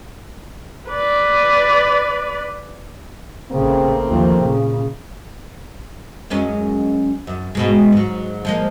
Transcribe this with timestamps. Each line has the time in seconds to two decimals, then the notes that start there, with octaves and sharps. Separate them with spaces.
0.90 B4 D5
3.51 A1 C#3 A3 A#3 C4
4.09 D#2 F3
4.41 A#2 C#3
6.30 F#2 G#3 C#4
7.27 F#2
7.55 G#2 B2 G#3
7.92 G#2 F#3
8.45 F3 G#3 A#3